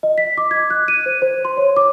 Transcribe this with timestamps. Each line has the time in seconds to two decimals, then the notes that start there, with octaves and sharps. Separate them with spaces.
0.03 D#5
0.18 B6
0.38 D6
0.51 G#6
0.70 F#6
0.88 D#7
1.06 C5
1.22 C5
1.45 C6
1.57 C#5
1.76 D6